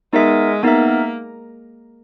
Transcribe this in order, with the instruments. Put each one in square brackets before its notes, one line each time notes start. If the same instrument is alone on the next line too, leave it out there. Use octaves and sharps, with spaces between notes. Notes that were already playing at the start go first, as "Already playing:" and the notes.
[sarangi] G#3 [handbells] B3 D#4 A#4 E5
[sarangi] A#3 [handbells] B3 D#4 A#4 E5